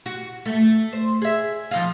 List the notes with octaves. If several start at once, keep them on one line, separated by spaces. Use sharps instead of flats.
F#4
A3
C5
G#4 E5
F3 D#4 F4